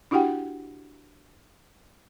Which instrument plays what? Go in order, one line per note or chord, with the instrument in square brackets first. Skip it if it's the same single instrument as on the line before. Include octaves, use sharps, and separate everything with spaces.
[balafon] D4 E4 F#4 G4 F#5 G5